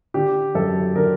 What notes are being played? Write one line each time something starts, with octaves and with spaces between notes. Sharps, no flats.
D3 G4
F#2 A4
D3 A#4